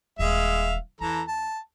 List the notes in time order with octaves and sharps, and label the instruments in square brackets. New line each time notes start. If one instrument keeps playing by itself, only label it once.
[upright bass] D#1 E3 [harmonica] G#3 E5 F5
[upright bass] E2 [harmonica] E3 A4 A#5
[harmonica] A5